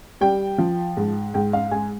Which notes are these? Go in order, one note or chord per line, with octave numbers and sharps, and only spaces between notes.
G3 G5
F3
G#2
G#2 G5
F5
G#3 G#5